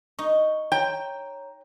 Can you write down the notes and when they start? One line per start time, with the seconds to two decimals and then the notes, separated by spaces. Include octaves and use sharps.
0.19 D#4 C#6
0.72 C#5 G5 A#5